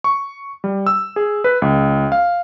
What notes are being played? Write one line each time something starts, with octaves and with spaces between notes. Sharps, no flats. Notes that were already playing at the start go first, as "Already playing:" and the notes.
C#6
G3
E6
G#4
B4
C#2
F5